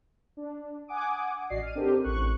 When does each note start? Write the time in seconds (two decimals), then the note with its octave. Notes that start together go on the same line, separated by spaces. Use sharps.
0.37 D4
0.88 F#5 G#5 D6 D#6
1.50 A1 F#4 D5 D#5 C7
1.62 F6 D#7
1.75 C4 D4 G4 A4 A#4
2.04 A1 C#6 F#6